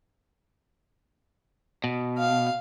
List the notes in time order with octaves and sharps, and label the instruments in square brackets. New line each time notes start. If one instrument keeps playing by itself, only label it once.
[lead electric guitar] B2
[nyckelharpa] F5